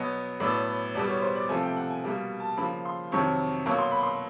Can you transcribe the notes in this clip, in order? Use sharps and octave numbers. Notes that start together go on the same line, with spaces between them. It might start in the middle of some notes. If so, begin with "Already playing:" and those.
Already playing: B2 F#3 B3 D#5
A2 F#3 B3 D5
E2 B2 G3 B3 D5
C#5
C5
D5
C3 F3 A3 G#5
G5
F#5
G#5
B2 G3 A#3
A5
C#3 F3 A#3 B5
C6
F2 C3 D#3 F#3 C#6
B2 F#3 A#3 C#6
C6
B5
C6